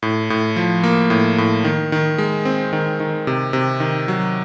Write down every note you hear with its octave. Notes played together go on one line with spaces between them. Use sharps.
A2
A2
F3
A#3
A2
A2
D#3
D#3
G#3
C4
D#3
D#3
C3
C3
D#3
F#3